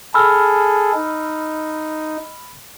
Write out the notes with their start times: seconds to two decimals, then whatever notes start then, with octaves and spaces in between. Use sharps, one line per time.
0.14 G#4 A4 B5 E6 F6
0.94 D#4